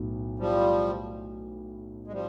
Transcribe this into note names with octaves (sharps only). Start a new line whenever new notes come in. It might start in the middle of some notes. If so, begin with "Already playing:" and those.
Already playing: B1 A2 F#3 B3
F3 G3
G#3
F3 G3